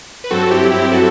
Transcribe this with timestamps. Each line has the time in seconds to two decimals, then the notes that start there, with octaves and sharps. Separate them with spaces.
0.24 B4
0.30 G2 F#3 C4 F#4 A4
0.51 E4 G4
0.71 E4 G4
0.92 F#4 A4